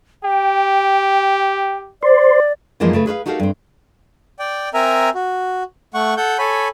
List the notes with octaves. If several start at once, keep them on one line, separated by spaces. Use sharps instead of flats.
G4 G5
C5 D5
F#2 E3 F3 G#3 A#3 D#4
C#3 A3 B4
G#4 B4 C5 F5
D#4 F#4 G4 A4 A#4 F5
G2 C4
D5 G5
C4 A#4 E5 G#5 A#5
F#4
A3 F#5 C#6
A4 F#5 G6
A4 C#5 G#5 B5